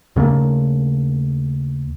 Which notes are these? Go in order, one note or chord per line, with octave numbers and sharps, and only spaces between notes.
D#2 C#3 A3 A#3